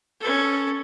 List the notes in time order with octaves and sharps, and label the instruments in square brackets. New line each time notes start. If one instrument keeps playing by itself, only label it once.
[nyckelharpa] C#4 A4